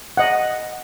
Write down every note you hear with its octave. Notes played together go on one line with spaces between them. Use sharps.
D#5 F#5